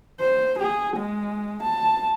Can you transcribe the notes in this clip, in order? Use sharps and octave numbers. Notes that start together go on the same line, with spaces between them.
C5
G#4
G#3
A5